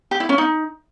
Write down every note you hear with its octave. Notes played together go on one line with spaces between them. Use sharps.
G4
E4
C#4
D#4